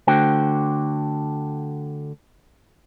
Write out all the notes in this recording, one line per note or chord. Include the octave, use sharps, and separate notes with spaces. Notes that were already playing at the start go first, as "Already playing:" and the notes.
D3 A3 F#4 C5 G5